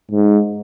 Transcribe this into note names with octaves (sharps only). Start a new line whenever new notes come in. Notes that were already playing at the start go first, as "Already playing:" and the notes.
G#2